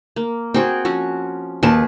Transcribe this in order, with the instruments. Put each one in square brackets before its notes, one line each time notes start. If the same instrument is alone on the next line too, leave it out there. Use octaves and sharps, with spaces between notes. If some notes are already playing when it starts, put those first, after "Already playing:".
[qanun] A#3
[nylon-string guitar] C4 [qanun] F#4 G#4 G5
[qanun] F3 C#4 F#4
[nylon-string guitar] D#2 A5 [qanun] G#4 B4